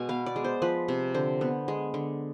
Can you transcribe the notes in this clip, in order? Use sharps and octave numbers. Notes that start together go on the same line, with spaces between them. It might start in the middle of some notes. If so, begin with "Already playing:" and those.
Already playing: B2 G#3 G#5
B3 F5
D5
G#3
C5
F3 B4
C3
D3 C5
B3
G#3
D3